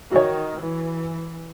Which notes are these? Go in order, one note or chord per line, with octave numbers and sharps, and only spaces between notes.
D#3 F#4 C#5
E3